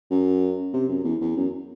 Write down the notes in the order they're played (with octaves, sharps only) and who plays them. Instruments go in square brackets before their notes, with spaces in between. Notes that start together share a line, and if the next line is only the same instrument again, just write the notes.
[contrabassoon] F#2
C3
F#2
E2
E2
F#2